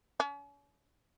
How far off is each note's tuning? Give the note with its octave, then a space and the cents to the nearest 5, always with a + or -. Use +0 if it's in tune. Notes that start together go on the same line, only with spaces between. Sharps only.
C#4 +40